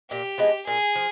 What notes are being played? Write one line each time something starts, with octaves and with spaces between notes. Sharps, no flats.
A#2 G4
F3 G#3 B3
A#2 G#4
F3